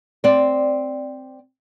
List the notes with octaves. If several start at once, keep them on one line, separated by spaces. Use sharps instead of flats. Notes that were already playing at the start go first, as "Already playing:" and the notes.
C4 D5